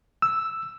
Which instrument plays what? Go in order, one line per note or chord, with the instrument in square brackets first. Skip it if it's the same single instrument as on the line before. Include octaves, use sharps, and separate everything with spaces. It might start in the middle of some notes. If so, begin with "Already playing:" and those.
[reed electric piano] E6